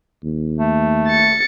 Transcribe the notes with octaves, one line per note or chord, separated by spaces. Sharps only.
D#2
A3
A6 C#7